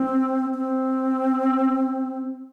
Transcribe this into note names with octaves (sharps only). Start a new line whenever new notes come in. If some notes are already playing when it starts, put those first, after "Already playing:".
Already playing: C4
C4